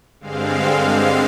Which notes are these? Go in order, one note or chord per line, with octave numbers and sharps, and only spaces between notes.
G2 D3 G#3 C4 F5
F5